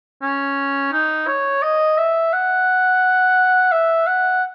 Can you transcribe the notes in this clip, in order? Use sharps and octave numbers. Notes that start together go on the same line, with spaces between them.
C#4
D#4
C#5
D#5
E5
F#5
E5
F#5